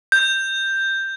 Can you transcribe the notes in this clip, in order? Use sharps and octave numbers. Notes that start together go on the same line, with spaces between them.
G6